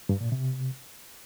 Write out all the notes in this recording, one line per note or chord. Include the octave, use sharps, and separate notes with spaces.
G2
A#2
C3